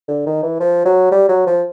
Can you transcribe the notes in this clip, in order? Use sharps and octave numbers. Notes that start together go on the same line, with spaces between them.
D3
D#3
E3
F3
F#3
G3
F#3
F3